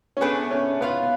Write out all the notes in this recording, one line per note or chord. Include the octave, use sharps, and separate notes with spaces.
C#4
A3 B3 D4 G#4 B4
C#4
B3 F4 B4 F5